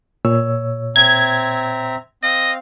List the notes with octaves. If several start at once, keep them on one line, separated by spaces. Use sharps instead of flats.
A#2 C#5 E6
C4 E5 A#5 G#6
C4 D#5 F5